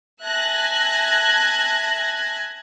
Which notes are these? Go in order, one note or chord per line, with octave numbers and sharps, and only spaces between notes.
E5 G#5 A5 F#6 G#6 A#6